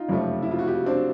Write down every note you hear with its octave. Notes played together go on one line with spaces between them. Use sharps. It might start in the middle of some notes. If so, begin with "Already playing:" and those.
Already playing: D#4 F4
F#1 F2 C3 F3 A3
E4
F4
F#4
F4 G4
C4 D4